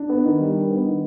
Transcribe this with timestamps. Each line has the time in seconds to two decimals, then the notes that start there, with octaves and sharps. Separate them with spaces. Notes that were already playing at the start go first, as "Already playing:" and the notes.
Already playing: D4
0.09 B3
0.25 D#3
0.40 G3
0.55 D4
0.71 B3
0.87 D#3